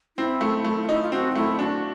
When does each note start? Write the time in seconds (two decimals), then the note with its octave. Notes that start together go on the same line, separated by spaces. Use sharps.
0.17 C4 E4
0.41 A3
0.64 A3
0.83 F4
0.89 D#4 E4
1.02 F4
1.12 C4 F#4
1.31 D#4
1.35 A3 E4
1.59 D4 F#4